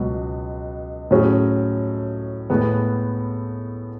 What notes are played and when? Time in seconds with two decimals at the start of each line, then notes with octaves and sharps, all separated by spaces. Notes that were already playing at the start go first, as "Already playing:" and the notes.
Already playing: C#2 B2 F#3
1.11 A2 F#3 C#4 G#4
2.50 A2 G#3 B3